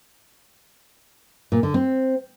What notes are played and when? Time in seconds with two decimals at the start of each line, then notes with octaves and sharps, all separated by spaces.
1.52 A#2
1.63 D3
1.74 C4